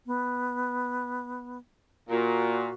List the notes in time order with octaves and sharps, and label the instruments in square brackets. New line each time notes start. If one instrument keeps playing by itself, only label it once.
[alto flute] B3
[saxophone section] A#2 [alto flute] F#4